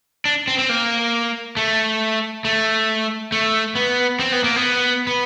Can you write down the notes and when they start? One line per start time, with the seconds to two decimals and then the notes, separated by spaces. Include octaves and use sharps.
0.25 D4
0.48 C4
0.58 C4
0.69 A#3
1.57 A3
2.45 A3
3.32 A3
3.75 B3
4.20 C4
4.32 B3
4.44 A#3
4.56 B3
5.07 B3